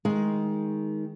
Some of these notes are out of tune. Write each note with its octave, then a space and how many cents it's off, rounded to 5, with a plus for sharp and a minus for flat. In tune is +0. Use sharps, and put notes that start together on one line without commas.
D#3 +15 G#3 +0